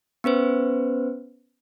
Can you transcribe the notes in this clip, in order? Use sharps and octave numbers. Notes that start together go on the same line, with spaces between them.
B3 C#4 B4 C5